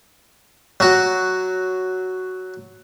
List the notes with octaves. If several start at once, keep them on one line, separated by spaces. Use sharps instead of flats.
F#3 F#4